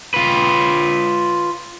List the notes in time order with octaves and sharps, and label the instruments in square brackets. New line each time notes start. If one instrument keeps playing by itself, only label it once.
[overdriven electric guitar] F4 B4